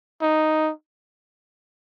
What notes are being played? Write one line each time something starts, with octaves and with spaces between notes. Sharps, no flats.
D#4